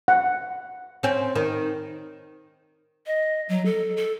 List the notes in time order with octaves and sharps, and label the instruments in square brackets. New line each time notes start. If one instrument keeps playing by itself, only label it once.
[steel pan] F#5
[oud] C4 C#4
D#3
[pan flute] D#5
F#3
A4
A4